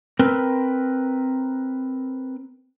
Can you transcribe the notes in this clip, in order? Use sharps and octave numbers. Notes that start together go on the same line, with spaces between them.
C4 A#4 B4